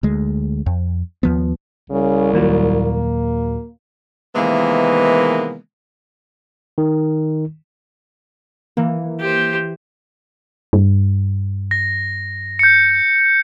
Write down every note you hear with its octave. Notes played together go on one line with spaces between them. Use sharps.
D2 G#3
F2
D#2 F3 B3
C2 C#3
D#2 A#2 F#3 A#3
C3 D#3 E3 G#3 A#3 B3
D#3
E3 A#3
G4 C5
G2
A#6
G6 C#7